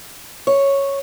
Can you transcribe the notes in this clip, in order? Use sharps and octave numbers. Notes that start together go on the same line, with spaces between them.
C#5